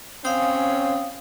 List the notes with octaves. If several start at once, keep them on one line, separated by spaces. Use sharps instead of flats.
C4 C#4 F5 D#6